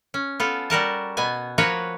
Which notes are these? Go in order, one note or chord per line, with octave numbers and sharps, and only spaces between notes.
C#4
B3 F4 A4
G3 F#4 A#4 A5
B2 B3 G#5
F3 A#3 F#4 B4 C#5 A#5